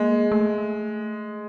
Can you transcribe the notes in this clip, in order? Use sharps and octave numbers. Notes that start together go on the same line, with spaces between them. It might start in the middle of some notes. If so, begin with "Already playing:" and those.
Already playing: G#3 A#3
A3